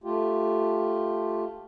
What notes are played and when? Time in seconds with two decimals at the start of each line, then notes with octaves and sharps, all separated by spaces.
0.04 A3 F4 G4